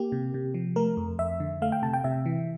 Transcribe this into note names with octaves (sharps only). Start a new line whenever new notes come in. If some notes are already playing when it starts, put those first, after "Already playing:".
Already playing: A#3 G4
C3
C3
F3
A3 A#4
F2
F2 E5
D3
A3 F5
G5
C3 A5
G5
C3 E5
E3